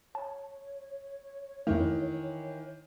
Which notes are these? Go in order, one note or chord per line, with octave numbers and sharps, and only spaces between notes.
C#5 A5
F2 D#3 E3 A3 A#3